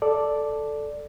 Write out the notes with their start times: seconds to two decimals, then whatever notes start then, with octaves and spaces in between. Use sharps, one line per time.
0.02 A4 D5